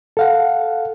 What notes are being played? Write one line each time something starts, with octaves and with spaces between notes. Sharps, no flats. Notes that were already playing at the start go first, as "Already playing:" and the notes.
A4 F5 F#5